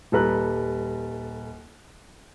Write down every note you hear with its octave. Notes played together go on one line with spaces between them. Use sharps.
D#1 G3 A4 B4 A#5 F#6